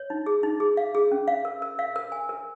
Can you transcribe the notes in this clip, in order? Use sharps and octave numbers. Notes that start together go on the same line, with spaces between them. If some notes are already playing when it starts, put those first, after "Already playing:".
Already playing: C#5
D#4
G#4
D#4
G#4
F5
G#4
C#4
F5
A#4
A#4
F5
A#4
G#5
A#4